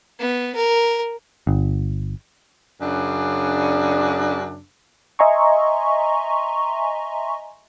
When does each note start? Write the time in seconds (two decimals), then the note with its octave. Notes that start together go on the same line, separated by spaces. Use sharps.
0.19 B3
0.55 A#4
1.47 G1
2.80 F#2 C#3 D4
5.19 D#5 E5 G#5 A#5 C6 C#6